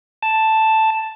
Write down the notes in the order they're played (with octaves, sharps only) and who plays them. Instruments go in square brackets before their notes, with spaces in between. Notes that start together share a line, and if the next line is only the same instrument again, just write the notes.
[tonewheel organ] A5